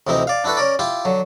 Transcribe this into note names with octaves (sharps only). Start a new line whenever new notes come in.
D2 C3 E3 C4 D#4
D5 F5
D4 E4 F#4 A4 B4
C#4 A#4 D5
E4 F4 G4
D3 F#3